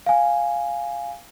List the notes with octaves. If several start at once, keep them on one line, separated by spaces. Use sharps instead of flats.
F5 G#5